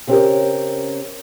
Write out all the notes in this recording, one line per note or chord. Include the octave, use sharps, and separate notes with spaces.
C#3 C4 C#4 F4 G4 A#4